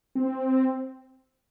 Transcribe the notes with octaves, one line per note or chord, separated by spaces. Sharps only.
C4